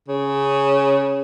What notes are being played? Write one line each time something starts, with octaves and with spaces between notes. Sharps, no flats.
C#3